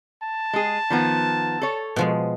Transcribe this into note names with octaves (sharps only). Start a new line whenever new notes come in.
A5
G#3 G#4
D#3 F3 B3
A4 C#5
B2 F3 G#3